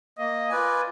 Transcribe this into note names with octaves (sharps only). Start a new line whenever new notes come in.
A#3 D#5
F4 B4 D5 G#5